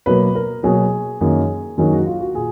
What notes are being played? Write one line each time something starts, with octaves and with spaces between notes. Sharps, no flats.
B2 F#3 A#3 B4
A#4
B2 F#3 A#3 G#4
F#2 D#3 F#3 A#3 G#4
F#2 D#3 F#3 A#3 G#4
F#4
F4
F#4
A#2 G#4